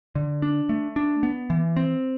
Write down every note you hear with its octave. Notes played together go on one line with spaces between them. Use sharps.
D3
D4
A3
D4
B3
E3
C4